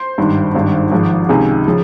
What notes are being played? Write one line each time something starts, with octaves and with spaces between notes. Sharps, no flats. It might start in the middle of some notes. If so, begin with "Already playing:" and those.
Already playing: C5 C6
G#1 G2 D#3
G#1 G2 D#3
G#1 G#2 F3
C#2 C3 D#3 G#4 G#5
C#3 F3